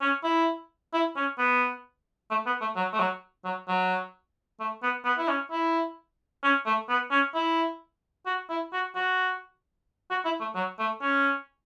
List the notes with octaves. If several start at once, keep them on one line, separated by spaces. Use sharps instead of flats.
C#4
E4
E4
C#4
B3
A3
B3
A3
F#3
A3
F#3
F#3
F#3
A3
B3
B3
E4
C#4
E4
C#4
A3
B3
C#4
E4
F#4
E4
F#4
F#4
F#4
E4
A3
F#3
A3
C#4